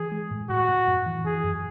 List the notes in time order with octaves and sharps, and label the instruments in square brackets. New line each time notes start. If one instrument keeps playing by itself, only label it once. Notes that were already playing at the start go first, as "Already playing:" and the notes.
Already playing: [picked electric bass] E3 [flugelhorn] G#4
[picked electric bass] G#3
A2
[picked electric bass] A2 [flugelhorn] F#4
[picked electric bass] A2
F#2
E3
[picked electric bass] E3 [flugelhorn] G#4
[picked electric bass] F#2